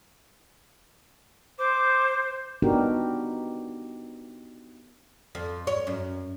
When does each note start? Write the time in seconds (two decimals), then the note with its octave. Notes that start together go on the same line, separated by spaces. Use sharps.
1.58 C5 D6
2.62 B3 D4 D#4 F#4 G4 A#4
5.35 F2
5.67 C#5
5.87 F#2